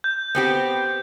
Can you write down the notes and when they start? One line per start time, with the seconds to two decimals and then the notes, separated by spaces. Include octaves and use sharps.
0.04 G6
0.35 B3 C4 G4